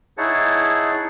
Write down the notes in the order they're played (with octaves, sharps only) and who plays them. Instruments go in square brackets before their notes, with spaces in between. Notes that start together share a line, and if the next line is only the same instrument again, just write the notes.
[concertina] D#4 E4 G#4 C#5 F#5 A5